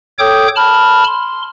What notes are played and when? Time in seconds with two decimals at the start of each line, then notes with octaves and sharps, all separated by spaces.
0.19 A4 C#5 G5 D6 D#6 G6
0.56 A5 B5 F6
1.07 C6